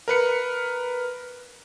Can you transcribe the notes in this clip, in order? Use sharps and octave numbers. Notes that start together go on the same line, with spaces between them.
A#4 B4 C#7